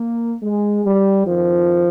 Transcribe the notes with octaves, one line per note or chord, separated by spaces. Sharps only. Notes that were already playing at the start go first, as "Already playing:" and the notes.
Already playing: A#3
G#3
G3
F2 D#3 F3